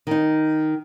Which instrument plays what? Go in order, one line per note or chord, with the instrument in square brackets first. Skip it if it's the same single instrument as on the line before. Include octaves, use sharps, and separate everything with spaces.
[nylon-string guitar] D#3 D#4